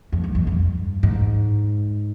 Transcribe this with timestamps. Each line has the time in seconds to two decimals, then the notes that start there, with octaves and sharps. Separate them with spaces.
0.12 F2
0.24 G2
0.35 F2
0.47 G2
1.03 G#2